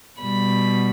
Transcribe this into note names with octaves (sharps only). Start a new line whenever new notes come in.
B2 G3 B5